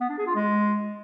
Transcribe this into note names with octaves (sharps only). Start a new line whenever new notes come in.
B3
D4
G#4
F4
G#3